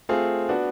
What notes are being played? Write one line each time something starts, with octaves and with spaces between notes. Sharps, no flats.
A3 C4 F4 G#4
B3 D4 F#4